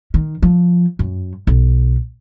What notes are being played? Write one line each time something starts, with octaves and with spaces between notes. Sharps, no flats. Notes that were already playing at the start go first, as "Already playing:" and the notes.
D#3
F3
F#2
B1